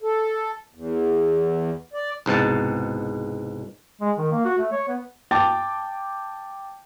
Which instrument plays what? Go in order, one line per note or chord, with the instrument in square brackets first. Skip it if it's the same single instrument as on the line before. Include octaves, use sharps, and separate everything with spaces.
[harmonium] A4
E2
D5
[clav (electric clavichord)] C2 G#2 B2 A5
[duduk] G#3
D#3
A#3
F#4
A3
C#5
B3
[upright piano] G5 A5 D6 A6